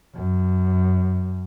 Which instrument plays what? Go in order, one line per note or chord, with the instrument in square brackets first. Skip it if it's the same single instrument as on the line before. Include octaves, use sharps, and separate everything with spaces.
[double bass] F#2